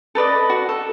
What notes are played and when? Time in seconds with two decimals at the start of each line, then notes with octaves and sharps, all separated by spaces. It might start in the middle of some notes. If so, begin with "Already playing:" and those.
0.15 A4 B4 D5 D#5
0.50 F#4
0.69 A4